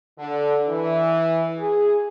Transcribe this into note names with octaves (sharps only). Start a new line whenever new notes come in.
D3
E3
G#4